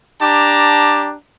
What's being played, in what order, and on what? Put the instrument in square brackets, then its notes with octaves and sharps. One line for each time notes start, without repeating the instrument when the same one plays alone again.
[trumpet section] D4 G4 A5 A#5